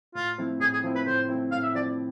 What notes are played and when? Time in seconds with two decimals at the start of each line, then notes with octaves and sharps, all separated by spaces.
0.15 A2 F4
0.38 F3 A3 C4 E4
0.60 A2 G#4
0.73 G#4
0.83 F3 A3 C4 E4
0.95 B4
1.06 A2 C5
1.29 F3 A3 C4 E4
1.51 A2 F5
1.63 E5
1.74 F3 A3 C4 E4 D5